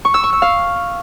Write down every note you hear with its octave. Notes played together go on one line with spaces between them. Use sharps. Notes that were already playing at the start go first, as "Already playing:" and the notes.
C#6
E6
C#6
E6
F5